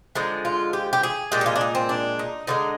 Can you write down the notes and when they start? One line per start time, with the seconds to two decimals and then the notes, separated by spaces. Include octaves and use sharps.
0.15 D3 F3 G#3 D#4
0.45 F4
0.73 G4
0.93 G4
1.03 G#4
1.32 A#2 G#3 G4
1.41 D#4
1.46 F4
1.56 D4
1.61 D#4
1.75 C4
1.89 D4
2.19 D#4
2.47 D3 F3 G#3 D#4